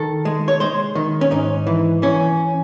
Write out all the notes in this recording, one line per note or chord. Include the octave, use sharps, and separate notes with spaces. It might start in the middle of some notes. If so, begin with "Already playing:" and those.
Already playing: D#3 A4
G#3
C#5
G#3 C5
D#3
C#4
G#2 D#4
E3
E3 C#4